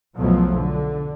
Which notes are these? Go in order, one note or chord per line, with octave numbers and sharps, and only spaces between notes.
B1 E2 B2 F3 F#3 A3
D3